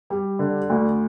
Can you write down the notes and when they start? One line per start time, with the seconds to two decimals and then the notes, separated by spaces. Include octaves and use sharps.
0.10 G3
0.39 D3
0.70 D2